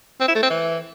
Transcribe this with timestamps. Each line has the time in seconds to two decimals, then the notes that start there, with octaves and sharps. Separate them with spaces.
0.21 C4
0.28 E4
0.35 A3
0.43 C4
0.50 E3